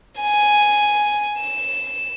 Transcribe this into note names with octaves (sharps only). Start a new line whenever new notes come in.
G#5
E7